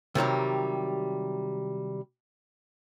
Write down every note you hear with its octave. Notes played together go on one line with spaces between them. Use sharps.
C3 D#3 F#3 G3